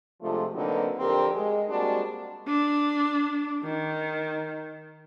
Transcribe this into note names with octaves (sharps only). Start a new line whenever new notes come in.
C3 F3 G#3 A3 D4 F4
D3 F#3 A#3 C4 D#4 B4
F2 C4 D4 G4 A#4
G#3
G3 G#3 A#3 C4 D4 F#4
D4
D#3